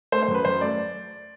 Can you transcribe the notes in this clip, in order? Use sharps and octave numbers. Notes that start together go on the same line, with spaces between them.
A3 C5
C5
F#2
B4
F#2 C5
A3 D5